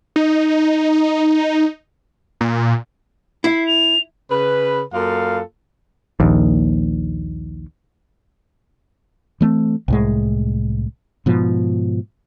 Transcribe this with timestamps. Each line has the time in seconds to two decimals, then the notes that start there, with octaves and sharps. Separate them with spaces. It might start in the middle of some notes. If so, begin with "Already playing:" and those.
0.16 D#4
2.41 A#2
3.44 E4 C7
3.66 F7
4.31 C#3 B4
4.93 F#2 A#3 F4 A4 F5
6.20 A#1 D#2
9.41 E3 A3 A#3 C4
9.88 C2 A2 G#3
11.26 G#2 B2 F3